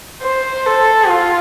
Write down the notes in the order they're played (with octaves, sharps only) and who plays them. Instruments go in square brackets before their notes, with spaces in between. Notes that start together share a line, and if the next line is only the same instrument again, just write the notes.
[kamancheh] C5
A4
F4